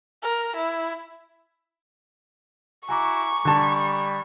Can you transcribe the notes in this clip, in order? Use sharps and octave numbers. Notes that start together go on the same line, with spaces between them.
A#4
E4
E4 F#4 G#5 A#5 C#6 D6
D3 G3 A5